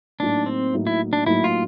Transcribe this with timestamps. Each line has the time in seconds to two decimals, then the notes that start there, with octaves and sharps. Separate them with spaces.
0.20 A2 F#3 A#3 D4 D#4
0.46 C4
0.73 A2 F#3 A#3 D#4
0.87 E4
1.13 D4
1.26 A2 F#3 A#3 D#4 E4
1.44 F4